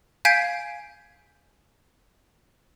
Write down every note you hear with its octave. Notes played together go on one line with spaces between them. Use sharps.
F5 G#5 G6 G#6 B6 D7